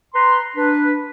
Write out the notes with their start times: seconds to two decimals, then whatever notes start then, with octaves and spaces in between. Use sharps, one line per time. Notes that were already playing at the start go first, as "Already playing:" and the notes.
0.14 B4 A#5 C6
0.57 D4 B4